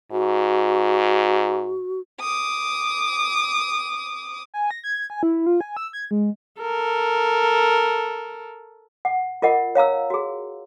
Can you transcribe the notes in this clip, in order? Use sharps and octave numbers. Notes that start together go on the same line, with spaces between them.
G#2 F#4
D6 D#6
G#5
A#6
G#6
G#5
E4
F4
G#5
E6
G#6
G#3
A4 A#4
F#5
F4 A#4 D#5 F#5
C#5 F5 A#5 E6
F#4 G#4